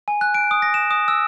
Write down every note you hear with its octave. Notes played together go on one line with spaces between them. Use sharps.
G#5
F#6
D7
D#6
A#6
E7
D#6
E6